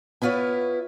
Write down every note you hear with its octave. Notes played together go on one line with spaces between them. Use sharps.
B3 E4 F4 B4 C#5